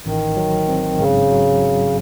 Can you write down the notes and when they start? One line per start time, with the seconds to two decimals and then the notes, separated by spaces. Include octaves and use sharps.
0.06 A1 D#3
0.37 F#3
0.68 C4
0.99 G#2 C#3
1.31 F#3
1.62 F#3